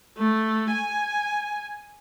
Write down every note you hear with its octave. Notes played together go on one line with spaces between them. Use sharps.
A3
G#5